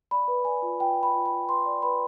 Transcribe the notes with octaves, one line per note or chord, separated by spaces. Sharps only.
D5 B5
B4
D5 G#5
F4
F4 G5
B4
B5
F4
B5
F4
B4 C6
D5
B4 B5